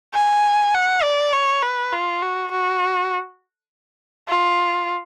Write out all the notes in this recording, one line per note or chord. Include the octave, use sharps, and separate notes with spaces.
G#5
F#5
D5
C#5
B4
F4
F#4
F#4
F4